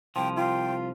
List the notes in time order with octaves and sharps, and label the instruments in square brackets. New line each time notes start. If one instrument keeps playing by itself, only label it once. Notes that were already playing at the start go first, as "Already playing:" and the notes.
[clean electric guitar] C2 F3 [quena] G5
[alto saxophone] F4 [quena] G5